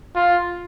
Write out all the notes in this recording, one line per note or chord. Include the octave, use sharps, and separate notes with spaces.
F4